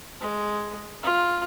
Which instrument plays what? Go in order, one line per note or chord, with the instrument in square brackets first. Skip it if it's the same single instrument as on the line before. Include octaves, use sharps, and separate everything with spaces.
[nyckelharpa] G#3
F4